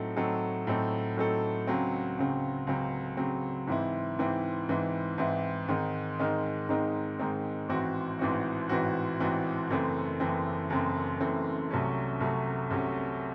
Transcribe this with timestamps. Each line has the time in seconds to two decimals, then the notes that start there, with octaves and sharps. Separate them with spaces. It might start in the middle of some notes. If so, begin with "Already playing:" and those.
Already playing: A2 F#3 C4 D#4 A4
0.16 A2 F#3 C4 D#4 A4
0.67 A2 F#3 C4 D#4 A4
1.17 A2 F#3 C4 D#4 A4
1.67 C#2 C#3 F#3 C4
2.18 C#2 C#3 F#3 C4
2.67 C#2 C#3 F#3 C4
3.17 C#2 C#3 F#3 C4
3.67 G#2 E3 C4 E4
4.19 G#2 E3 C4 E4
4.69 G#2 E3 C4 E4
5.18 G#2 E3 C4 E4
5.68 G#2 D#3 G#3 C4 D#4
6.19 G#2 D#3 G#3 C4 D#4
6.69 G#2 D#3 G#3 C4 D#4
7.19 G#2 D#3 G#3 C4 D#4
7.69 A1 G#2 E3 C4 F#4
8.19 A1 G#2 E3 C4 F#4
8.69 A1 G#2 E3 C4 F#4
9.20 A1 G#2 E3 C4 F#4
9.70 F#1 F#2 E3 A3 C4
10.20 F#1 F#2 E3 A3 C4
10.70 F#1 F#2 E3 A3 C4
11.20 F#1 F#2 E3 A3 C4
11.71 C2 C3 F#3 A3 C#4
12.20 C2 C3 F#3 A3 C#4
12.71 C2 C3 F#3 A3 C#4